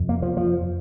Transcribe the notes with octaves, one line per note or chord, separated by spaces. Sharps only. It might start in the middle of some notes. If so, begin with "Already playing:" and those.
Already playing: F2 C3
A#3
F3
F3